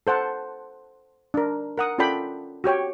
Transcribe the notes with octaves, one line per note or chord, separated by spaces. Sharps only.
A4 C5 F#5 A5
D4 A#4
A#4 F#5 D#6
C#4 F4 A4 D5 G5 B5
F#4 G4 C#5 G5